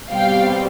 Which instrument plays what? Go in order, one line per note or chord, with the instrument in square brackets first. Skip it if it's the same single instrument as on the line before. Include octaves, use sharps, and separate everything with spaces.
[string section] B2 G3 C4 F5 G5